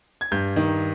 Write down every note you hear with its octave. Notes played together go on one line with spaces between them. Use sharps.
G#6
G2 G6
D#3